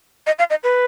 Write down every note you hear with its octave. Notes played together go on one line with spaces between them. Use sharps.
D#5
F5
D#5
B4